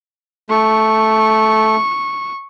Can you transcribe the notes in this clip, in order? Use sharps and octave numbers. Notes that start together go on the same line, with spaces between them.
A3 C#6